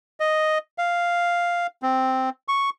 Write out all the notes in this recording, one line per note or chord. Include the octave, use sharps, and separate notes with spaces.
D#5
F5
C4
C#6